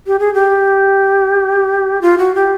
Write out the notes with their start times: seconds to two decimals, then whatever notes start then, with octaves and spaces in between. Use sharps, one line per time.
0.07 G4
0.19 G#4
0.34 G4
2.02 F4
2.18 F#4
2.35 G4